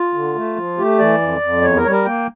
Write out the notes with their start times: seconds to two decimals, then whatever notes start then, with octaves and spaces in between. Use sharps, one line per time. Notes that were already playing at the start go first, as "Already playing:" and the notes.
Already playing: F4
0.14 D3
0.35 A3
0.56 F3
0.78 A3 G4
0.99 E3 D5
1.21 F2
1.41 F2
1.62 E2 C#5
1.76 A#4
1.84 G3 C#5
1.91 A#4
2.05 A#3 G5